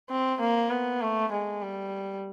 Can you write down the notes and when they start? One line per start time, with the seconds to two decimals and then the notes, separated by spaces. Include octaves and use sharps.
0.10 C4
0.41 A#3
0.70 B3
1.01 A3
1.32 G#3
1.62 G3